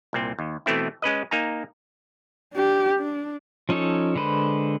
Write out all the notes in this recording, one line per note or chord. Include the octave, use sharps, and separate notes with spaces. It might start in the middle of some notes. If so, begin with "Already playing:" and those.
C2 A#2 C4
D#2
B2 E3 A3 C4 E4
G#3 C#4 B4 D#5
A#3 D#4 G#5 A#5
D4 G4
D4
F3 C#4 D#4 A4 C#5
D3 G#3 B4 C5